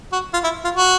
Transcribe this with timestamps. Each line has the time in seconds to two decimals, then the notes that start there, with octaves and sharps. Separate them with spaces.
0.12 F#4
0.33 F4
0.44 E4
0.64 F4
0.74 F#4